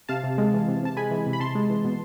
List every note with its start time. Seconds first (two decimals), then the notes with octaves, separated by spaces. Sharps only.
0.09 C3 F5 A5
0.24 C3
0.38 G#3
0.54 E3
0.68 C3
0.83 C3 A5
0.97 G#3 G#5 B5
1.11 E3
1.26 C3
1.33 B5
1.40 C3 A5 C6
1.55 G#3
1.70 E3
1.84 B2